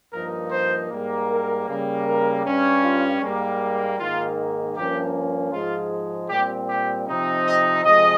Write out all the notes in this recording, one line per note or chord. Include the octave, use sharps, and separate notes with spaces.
G2 F3 A#3 D#4 A#4
C5
G#2 G3 A#3
A#4
C#3 G3 A#3
A#4
G2 G3 C#4
F4
G#2 G3 A#3
G#2 D#3 A#3 F4
G2 F3 A#3 C#4 G4
G#2 F3 G#3 F4
A#2 G3 C4 G4
G4
C3 F3 C4 D#4
D#5
C3 F3 G#3 D#5